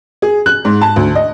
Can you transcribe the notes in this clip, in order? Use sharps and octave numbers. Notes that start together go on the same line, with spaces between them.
G#4
F#6
G#2
A5
D2
D#5